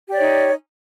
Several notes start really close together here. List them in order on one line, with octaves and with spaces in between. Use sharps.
G4 D5 C#5 D#4